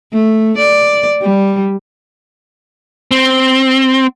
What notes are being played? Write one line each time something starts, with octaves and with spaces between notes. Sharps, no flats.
A3
D5
G3
C4